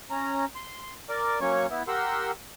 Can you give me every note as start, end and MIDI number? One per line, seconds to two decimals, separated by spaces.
0.10 0.45 61
0.10 0.45 82
0.55 0.94 84
1.09 1.39 70
1.09 1.39 74
1.09 1.39 86
1.41 1.66 54
1.41 1.66 58
1.41 1.66 61
1.41 1.66 73
1.41 1.66 85
1.70 1.83 59
1.70 1.83 64
1.88 2.31 67
1.88 2.31 70
1.88 2.31 78
1.88 2.31 84
1.88 2.31 88